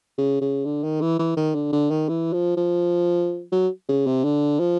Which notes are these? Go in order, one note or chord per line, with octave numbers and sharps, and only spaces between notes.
C#3
C#3
D3
D#3
E3
E3
D#3
D3
D3
D#3
E3
F3
F3
F#3
C#3
C3
D3
F3